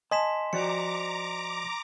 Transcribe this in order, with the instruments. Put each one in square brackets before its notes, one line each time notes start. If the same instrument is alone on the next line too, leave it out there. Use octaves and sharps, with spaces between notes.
[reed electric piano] D#5 G#5 [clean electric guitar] A5 [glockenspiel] C6 B6 E7
[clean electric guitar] F3 F#4 D5 [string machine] A#5 D6 [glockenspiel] C#7